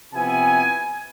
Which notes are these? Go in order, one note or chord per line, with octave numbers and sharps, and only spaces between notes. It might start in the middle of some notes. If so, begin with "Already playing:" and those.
C3 F3 B3 E4 G#5